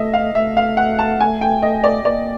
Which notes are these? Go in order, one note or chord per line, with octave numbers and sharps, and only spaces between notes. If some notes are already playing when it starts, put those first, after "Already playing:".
Already playing: A3 D#5 E5
F5
A3 E5
F5
F#5
A5
G#5
G5
D#5
D5
A#3 D5